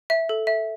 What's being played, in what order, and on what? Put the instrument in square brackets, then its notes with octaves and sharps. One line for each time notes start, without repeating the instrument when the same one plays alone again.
[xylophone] E5
A4
E5